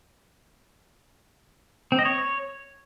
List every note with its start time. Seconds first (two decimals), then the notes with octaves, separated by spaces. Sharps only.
1.92 C4
1.99 D#5
2.05 C#5